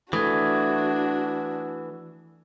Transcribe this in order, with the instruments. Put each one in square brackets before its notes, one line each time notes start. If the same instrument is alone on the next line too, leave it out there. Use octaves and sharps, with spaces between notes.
[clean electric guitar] E3 [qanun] A3 [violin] D4 F#4 [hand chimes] D#6 G#6